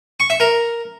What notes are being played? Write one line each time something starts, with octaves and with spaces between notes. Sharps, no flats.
C#6
E5
A#4